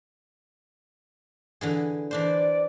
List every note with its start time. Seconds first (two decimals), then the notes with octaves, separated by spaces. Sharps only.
1.61 D3 E3 G#4
2.11 E3 D4 C5 D5